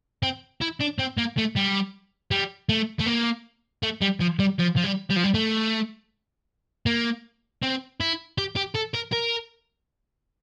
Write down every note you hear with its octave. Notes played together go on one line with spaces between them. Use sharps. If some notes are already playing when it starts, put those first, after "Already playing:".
C4
E4
D4
C4
A#3
A3
G3
G3
A3
A3
A#3
A3
G3
F3
G3
F3
F3
G3
G3
F3
G3
A3
A#3
C4
E4
G4
G4
A4
A#4
A#4